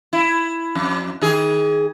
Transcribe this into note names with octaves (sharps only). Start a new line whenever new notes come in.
E4
F2
D#3 G#4